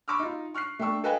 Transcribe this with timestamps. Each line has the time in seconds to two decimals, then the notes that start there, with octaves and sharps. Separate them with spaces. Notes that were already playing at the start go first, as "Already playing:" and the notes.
0.08 B5 C#6 D6 E6 F6
0.19 D#4 F4
0.54 C#6 F6 F#6 C7
0.79 A3 D4 G5 C#6 E6
1.04 A4 B4 D#5 F5 G5 G#5